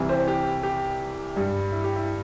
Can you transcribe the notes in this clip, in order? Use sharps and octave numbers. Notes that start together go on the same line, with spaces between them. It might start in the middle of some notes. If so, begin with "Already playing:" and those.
Already playing: C2 C3 E3
G4 C5
G4
G4
G2 G3
E4
G4
E4